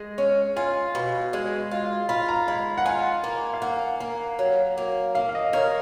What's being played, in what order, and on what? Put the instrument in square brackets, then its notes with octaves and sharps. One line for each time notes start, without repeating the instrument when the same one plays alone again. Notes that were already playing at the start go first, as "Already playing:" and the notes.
Already playing: [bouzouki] G#3
C#4
[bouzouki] F4 [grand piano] G#5
[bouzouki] B2
G#3
F4
[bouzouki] F4 [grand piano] B5
[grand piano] A#5
[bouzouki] G#3 [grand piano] B5
[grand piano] F#5
[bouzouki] F4 [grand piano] G#5
[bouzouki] A#3
[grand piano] F5
[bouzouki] A#3 [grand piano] F#5
[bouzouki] A#3
F#3
A#3
[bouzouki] A#3 [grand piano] F5
[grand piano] F5
D#5
[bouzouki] A#4 [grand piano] C#5